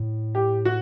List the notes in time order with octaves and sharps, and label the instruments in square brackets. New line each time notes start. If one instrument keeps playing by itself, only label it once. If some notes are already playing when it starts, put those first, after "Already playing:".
Already playing: [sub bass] A2
[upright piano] G4
F#4